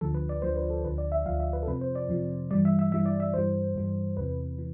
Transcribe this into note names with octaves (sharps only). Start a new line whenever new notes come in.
D2 D3 F3 A4
B4
D5
D2 D3 F3 C5
B4
A4
D2 D3 F3 B4
D5
E5
D2 D3 F3 F5
E5
B4
A4
F2 C3 F3 B4
C5
D5
F2 C3 F3
G2 E3 G3 D5
E5
E5
G2 E3 G3 E5
D5
E5
G2 E3 G3 C5
G2 E3 G3
E2 C3 E3 B4
E3